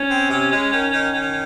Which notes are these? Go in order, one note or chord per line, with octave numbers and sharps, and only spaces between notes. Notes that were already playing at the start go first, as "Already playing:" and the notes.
Already playing: C#4
C4
C3
G#3
D#3
D#3
D#3